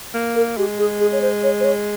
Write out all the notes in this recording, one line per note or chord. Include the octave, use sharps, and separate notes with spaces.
A#3
A#4
G#3 G4
G#4
G#4
C#5
C5
C#5
C5
C#5